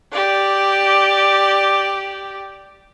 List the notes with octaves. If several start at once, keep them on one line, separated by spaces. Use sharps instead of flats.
G4 D5